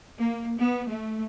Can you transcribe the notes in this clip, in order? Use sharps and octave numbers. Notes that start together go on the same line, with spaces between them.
A#3
B3
A3